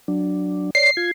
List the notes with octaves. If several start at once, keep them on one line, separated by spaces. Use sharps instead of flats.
F#3 D4
C#5 D5 C7
F4 G#6